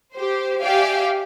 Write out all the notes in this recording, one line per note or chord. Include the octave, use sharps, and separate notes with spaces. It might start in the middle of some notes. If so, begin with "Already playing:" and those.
G4 C5
G4 D5 E5 F5 G5 G#5